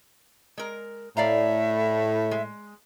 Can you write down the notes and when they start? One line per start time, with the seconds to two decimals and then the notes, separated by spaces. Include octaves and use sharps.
0.58 G#3 A#4
1.17 A2 D5 E5 F5 A#5
2.31 G#3